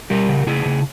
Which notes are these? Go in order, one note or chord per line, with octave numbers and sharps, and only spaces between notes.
G3 G4 A#4
C#3
C#3 E4 G#4
C#3